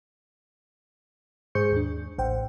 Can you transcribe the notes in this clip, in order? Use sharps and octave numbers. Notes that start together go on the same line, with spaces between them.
G#2 G#4 C5 C#6 G6 C#7
D#2 D4
A1 A2 C5 F#5 G5